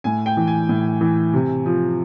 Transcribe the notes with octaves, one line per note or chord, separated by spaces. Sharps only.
A2 G#5
G5
E3
G#5
A2
E3
C3
F3